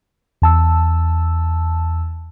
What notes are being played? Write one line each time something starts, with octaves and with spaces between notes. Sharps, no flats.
E2 A5 E6